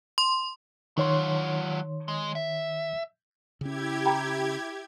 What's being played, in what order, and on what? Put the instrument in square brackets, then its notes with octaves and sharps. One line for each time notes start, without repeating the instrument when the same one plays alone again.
[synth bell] C6
[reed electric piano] D#3 C#5 C6 [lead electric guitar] F#3 F4
[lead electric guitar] G#3
E5
[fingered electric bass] C#3 C#4 [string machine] E4 G#6 [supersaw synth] G4
[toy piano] G5 A#5 B5